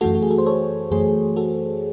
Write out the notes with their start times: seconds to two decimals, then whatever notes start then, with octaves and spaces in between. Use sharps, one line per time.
0.01 F#2 E3 A3 F#4 A4
0.15 F#4
0.23 G#4
0.31 A4
0.38 C5
0.46 A4 C#5
0.91 F#2 E3 A3 G#4 C5
1.36 F#4 A4